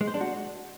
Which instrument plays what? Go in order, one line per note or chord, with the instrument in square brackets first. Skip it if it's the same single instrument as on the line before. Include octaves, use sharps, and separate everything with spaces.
[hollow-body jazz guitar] G#3
C5
D4
F#4